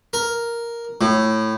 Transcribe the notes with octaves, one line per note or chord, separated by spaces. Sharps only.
A#4
A2